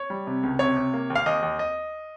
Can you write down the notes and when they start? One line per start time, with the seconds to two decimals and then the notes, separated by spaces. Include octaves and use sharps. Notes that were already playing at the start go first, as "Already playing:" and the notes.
Already playing: C#5
0.10 G3
0.27 C3
0.43 C#2
0.59 C3 C#5
0.77 C3
0.94 A#3
1.10 D#2
1.15 F5
1.26 D#2 D#5
1.42 D#2
1.59 D#5